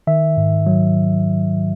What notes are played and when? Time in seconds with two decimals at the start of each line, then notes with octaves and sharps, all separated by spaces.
0.07 D#3 E5
0.37 G#2
0.67 F#3